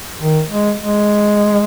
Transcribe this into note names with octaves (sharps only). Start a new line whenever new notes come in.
D#3
G#3
G#3